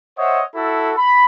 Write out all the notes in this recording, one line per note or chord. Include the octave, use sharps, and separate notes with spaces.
C5 C#5 D#5 E5 F#5
E4 F#4 A4
B5